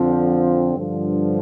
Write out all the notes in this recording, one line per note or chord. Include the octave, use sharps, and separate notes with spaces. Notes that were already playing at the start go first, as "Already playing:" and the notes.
Already playing: F2 D3 F3 C4
G2 D3 F3